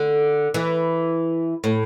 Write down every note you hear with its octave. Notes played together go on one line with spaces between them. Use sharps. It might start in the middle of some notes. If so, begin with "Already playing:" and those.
Already playing: D3
E3
A2